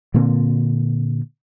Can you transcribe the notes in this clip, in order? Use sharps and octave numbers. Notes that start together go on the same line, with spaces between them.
A#2 D3 A#3 C4